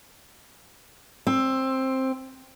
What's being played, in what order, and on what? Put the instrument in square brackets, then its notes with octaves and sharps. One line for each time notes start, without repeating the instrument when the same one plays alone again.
[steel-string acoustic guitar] C4